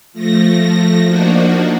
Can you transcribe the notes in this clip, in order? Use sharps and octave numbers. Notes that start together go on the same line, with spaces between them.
F3 A3 A#6
F3 A#3 D4 D#4 F#4